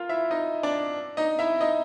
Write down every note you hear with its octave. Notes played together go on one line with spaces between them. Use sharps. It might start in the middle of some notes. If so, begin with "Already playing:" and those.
Already playing: F4 A#4 F5
E4 E5
D#4 D#5
D4 D5
D#4 D#5
E4 E5
D#4 D#5